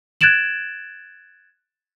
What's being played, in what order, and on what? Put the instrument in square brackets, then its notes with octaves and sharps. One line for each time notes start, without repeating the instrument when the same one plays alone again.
[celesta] F#6 G#6 A6 D7 E7 F#7